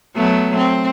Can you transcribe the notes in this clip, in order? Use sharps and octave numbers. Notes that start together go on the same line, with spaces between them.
F#3 A3 B3
C4